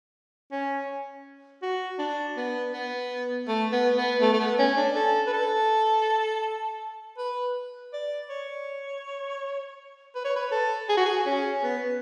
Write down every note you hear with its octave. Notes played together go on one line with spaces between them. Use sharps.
C#4
F#4
D4
B3
B3
A3
B3
B3
A3
A3
B3
C#4
D4
A4
B4
A4
B4
D5
C#5
B4
C#5
B4
A4
G#4
F#4
G#4
C#4
B3